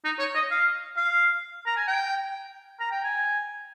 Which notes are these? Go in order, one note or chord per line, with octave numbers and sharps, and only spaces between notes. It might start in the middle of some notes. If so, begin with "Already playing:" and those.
D#4
C#5
D#5
F5
F5
A#5
G#5
G5
A#5
G5
G#5